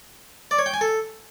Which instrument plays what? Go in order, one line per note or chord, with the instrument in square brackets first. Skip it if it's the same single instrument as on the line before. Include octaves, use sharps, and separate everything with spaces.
[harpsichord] D5
C#5
G5
G#5
A4